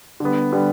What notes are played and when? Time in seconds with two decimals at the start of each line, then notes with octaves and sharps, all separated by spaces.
0.20 D3 G3 B3
0.52 D3 G3 B3